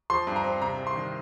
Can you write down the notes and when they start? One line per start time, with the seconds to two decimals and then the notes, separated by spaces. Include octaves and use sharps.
0.10 F3 C6
0.27 G2
0.36 A#5
0.44 C4
0.61 C3 A#5
0.78 C2
0.87 C6
0.95 D#3